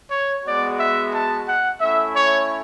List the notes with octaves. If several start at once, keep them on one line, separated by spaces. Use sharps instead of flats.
C#5
G#3 B3 F#4 D5
E5
A5
F#5
A3 C#4 E4 E5
C#5